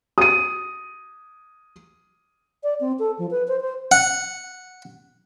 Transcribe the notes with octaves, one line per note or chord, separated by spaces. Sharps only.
D#6 D#7
D5
C4
A4
F3
B4
C5
C5
F#5